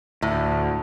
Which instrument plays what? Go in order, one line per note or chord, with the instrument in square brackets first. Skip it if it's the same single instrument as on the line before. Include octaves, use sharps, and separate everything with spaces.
[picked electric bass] D2 [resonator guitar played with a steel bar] A2